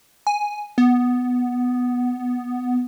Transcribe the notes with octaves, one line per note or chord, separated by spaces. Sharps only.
G#5
B3